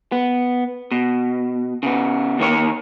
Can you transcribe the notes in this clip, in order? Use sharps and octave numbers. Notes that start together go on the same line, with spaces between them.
B3
B2
C#3 B3
D#2 D#3 A#3 C#5